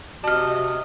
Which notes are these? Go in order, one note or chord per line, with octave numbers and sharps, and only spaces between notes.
C3 F#4 D#5 A5 F6